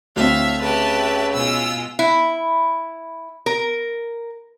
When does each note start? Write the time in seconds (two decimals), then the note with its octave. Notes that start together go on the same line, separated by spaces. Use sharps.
0.16 D2 A2 C4 E5 F5
0.62 C#3 G4 B4 E5 A5
1.34 B2 G#3 F4 E6
1.99 E4
3.46 A#4